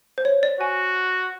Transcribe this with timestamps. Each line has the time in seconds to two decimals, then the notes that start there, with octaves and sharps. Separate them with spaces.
0.18 C5
0.25 C#5
0.43 D5
0.60 F#4 G#5